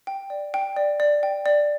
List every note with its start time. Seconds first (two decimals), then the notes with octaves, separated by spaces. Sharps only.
0.07 G5
0.30 D5
0.54 G5
0.76 D5
1.00 D5
1.23 G5
1.46 D5